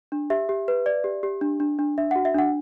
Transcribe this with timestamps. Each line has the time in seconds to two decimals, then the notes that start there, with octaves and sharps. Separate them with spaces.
0.12 D4
0.30 G4 E5
0.49 G4
0.68 B4
0.86 D5
1.04 G4
1.23 G4
1.41 D4
1.60 D4
1.79 D4
1.98 D4 E5
2.11 F#4 F#5
2.25 E5
2.35 D4 F#5